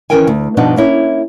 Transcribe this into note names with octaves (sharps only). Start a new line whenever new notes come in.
D#3 E3 C#4 A#4 G5 G#5
D2
G2 B2 F3 B3 D4 D#4
A#3 C#4 E4